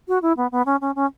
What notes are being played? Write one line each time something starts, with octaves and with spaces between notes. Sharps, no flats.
F#4
E4
B3
B3
C#4
C#4
C#4